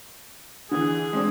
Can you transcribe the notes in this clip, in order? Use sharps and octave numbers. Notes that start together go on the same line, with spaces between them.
D3 E3 G#4
G#3 C4 D4